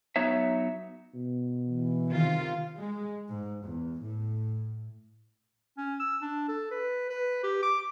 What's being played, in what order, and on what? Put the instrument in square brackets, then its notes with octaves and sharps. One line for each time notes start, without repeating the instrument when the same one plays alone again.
[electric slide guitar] F#3 B3 D#4 C#5 E5
[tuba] B2
[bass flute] E3
[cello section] C3 D#3 F4
[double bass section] G#3
G#2
E2
A2
[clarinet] C#4
E6
D4
A4
B4
B4
G4
D6